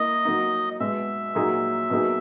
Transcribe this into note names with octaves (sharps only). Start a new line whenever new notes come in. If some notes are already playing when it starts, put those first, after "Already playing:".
Already playing: A#3 E4 D#5
F#3 A#3 D#4
B2 G#3 B3 E5
A#2 F#3 A#3 D#4 G#4
B2 F#3 A#3 D#4 G#4